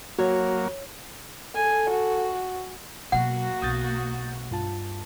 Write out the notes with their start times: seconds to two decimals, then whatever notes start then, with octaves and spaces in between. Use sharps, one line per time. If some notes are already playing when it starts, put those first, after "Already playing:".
0.19 F#3 A#3 F#4 C#5
1.55 A4 G#5
1.90 F#4
3.12 B2 F#3 A#3 F#4 F#5
3.62 B1 B2 D#6 G6 A6
4.51 G2 F4 A5